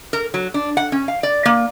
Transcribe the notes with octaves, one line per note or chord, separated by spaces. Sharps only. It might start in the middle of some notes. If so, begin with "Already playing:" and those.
A#4
F#3
D4
F#5
C#4
F5
D5
A#3